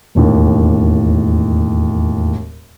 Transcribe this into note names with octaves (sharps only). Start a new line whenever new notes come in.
E1 D#2 A2